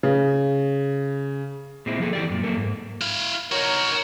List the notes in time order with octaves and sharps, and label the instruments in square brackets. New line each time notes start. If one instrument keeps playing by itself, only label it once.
[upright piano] C#3
[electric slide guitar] A#2 G#3 C4 E4
F3 A#3 G#4 A4
E3 G4 D5
F#2 A#2
F#3 A#3 A4 A#4
G#2
[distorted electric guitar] E4 F5
[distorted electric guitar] D#4 F#4 [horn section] A#4 C#5